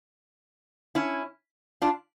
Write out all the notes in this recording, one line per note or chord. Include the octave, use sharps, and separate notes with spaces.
C#4 E4
D4 F4